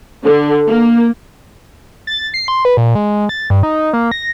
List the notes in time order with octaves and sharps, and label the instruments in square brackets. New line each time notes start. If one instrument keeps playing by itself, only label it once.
[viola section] D3
A#3
[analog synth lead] A6
C7
C6
B4
A#2
G#3
A6
G2
D#4
A#3
A#6